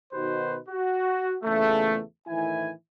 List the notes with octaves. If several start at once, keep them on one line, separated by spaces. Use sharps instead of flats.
B2 D#3 D#4 F#4 B4 C5
F#4
E2 A#2 C#3 A3
A2 D#3 E3 E4 G#5